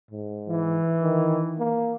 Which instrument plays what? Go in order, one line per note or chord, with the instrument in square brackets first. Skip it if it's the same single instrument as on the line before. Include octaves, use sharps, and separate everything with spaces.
[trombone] G#2
[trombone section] E3
[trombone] D#3
A#3